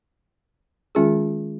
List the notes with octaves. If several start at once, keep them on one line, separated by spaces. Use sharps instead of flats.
D#3 G#3 C#4 F4 G#4